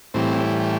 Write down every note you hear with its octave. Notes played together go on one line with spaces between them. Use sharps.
A2 E3 G3 C4